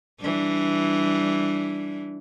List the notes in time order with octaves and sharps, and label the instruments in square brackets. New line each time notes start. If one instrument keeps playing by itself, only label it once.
[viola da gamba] E3 G3 D4